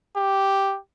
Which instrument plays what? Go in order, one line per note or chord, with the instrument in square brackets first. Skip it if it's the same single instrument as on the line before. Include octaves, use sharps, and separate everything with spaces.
[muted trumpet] G4